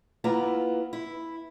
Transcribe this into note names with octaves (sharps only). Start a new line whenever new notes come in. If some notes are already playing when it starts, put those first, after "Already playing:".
A#3 B3 E4 F4 A#5
E4